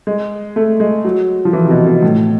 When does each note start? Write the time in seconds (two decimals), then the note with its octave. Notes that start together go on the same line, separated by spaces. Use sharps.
0.07 G#3
0.56 A3
0.80 G#3
1.05 F#3
1.45 F3
1.53 E3
1.65 C3
1.70 B2
1.86 B2
2.03 A2